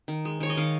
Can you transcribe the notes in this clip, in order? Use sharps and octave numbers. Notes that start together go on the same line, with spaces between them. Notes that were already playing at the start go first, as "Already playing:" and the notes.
D#3
G#3
D#3 C#5
D#5
D#3 F5